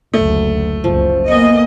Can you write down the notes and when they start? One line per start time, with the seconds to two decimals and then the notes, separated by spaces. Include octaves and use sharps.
0.14 F#1 D2 A3
0.84 F#1 C#2 F3
1.28 A#3 B3 D#5 F#5 G#5